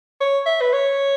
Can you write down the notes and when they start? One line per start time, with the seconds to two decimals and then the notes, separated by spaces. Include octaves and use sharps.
0.21 C#5
0.46 E5
0.61 B4
0.73 C#5